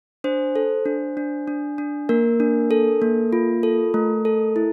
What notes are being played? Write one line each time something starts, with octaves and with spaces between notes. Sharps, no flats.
D4 C5
A4
D4
D4
D4
D4
A#3 A#4
D4
A4
A#3
F4
A4
A3
A4
E4